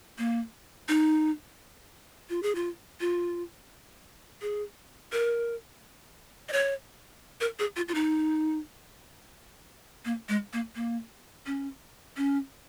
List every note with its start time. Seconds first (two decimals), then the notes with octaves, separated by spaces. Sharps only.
0.18 A#3
0.89 D#4
2.30 F4
2.43 G#4
2.55 F4
3.00 F4
4.42 G#4
5.13 A#4
6.49 D#5
6.53 C#5
7.41 A#4
7.59 G#4
7.76 F4
7.88 F4
7.95 D#4
10.05 A#3
10.29 G#3
10.53 A#3
10.76 A#3
11.46 C#4
12.17 C#4